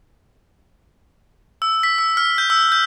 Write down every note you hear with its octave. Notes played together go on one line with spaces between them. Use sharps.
E6
B6
E6
F6
G6
E6
G6